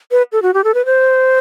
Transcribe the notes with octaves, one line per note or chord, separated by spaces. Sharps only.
B4
A4
F#4
G4
A4
B4
C5